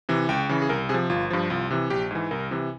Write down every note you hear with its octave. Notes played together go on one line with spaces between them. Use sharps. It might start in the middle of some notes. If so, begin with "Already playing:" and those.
C3 E3
C#2 G5
C#3 E3
G#4
C2 A#4
C3 F3 G#4
G1 F4
G2 F3
C2 F4
C3 E3
A#1 G4
G#2 E3
C2 A#4
C3 E3